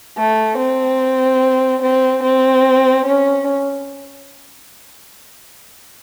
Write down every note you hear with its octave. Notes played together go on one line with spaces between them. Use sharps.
A3
C4
C4
C4
C#4